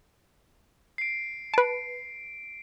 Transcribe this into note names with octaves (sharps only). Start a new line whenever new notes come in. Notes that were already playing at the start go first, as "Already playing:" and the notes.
C7 D7
B4 A5 D7